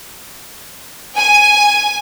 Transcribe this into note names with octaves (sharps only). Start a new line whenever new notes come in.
G#5